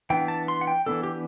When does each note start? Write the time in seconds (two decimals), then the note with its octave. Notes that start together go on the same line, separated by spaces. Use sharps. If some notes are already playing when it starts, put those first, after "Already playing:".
0.10 E3 B3 D4 G5
0.28 A5
0.48 C6
0.61 F#5
0.67 G5
0.86 E3 B3 D4 A4
1.03 G4